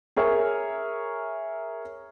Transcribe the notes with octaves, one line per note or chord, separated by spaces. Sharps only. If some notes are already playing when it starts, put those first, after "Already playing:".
G#4 A#4 C#5 E5